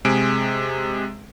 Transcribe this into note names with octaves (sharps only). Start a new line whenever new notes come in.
C3 G#3 G#4 D7